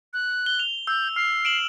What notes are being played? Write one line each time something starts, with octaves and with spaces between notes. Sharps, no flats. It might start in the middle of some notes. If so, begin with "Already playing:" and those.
F#6
G7
F7
E6 G6
F6 C7
D7 E7 F#7